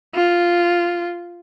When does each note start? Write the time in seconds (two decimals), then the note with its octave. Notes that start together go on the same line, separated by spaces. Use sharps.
0.15 F4